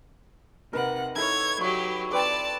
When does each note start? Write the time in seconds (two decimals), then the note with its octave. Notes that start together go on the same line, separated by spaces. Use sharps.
0.73 C3 D#4 A#4 B4 F#5
1.15 D#4 E4 A4 C#5 G#6
1.61 F#3 G4 C#6
2.11 C4 B4 D5 A5 D6